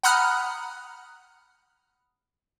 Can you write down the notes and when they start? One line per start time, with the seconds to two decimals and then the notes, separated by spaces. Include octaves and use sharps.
0.03 F#5 A#5 B5 D#6 F6 F#6